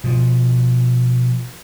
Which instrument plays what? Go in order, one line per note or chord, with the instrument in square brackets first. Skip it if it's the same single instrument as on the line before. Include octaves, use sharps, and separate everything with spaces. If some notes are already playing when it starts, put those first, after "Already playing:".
[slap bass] B2 F3